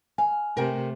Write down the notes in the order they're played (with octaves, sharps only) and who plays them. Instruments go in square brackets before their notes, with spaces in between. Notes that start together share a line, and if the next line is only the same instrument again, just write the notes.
[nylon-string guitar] F5 [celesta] G#5
[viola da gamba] C3 A3 [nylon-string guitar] A#4 G5